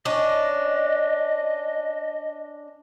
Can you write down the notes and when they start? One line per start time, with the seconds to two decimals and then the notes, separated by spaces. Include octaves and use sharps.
0.05 C#4 D4 D#5